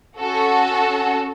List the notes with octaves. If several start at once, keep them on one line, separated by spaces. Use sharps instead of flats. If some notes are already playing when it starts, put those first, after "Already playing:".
C#4 F#4 A4